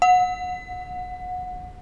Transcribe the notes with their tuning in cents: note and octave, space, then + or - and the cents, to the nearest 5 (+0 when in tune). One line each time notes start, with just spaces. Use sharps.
F#5 -25